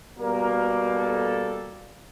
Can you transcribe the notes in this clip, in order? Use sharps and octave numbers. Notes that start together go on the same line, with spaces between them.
B2 G3 A#3 A#4
A4